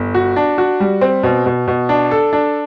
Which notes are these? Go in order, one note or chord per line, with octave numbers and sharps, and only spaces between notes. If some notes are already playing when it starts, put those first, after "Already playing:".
Already playing: G1
F#4
D4
F#4
G3
C4
B2
B2
B2
D4
A4
D4